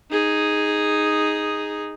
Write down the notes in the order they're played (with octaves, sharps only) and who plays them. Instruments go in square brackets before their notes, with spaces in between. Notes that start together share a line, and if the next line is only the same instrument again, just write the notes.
[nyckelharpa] D#4 G#4